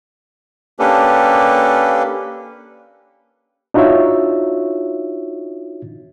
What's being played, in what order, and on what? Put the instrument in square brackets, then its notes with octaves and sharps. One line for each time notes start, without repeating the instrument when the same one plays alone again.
[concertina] A#3 C#4 D4 G4 A4 B4
[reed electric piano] D4 D#4 F4 F#4 C#5 E5